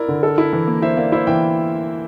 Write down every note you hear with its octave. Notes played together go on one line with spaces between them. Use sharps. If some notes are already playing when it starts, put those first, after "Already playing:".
Already playing: E4 A#4 D5
D3
A4
E4
E3
A#3
E4 C5 E5
A#3 D5 F5
E4 C5 E5
E3 E5 G5